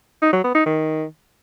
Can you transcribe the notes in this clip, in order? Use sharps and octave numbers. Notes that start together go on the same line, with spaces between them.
D#4
F#3
B3
D#4
D#3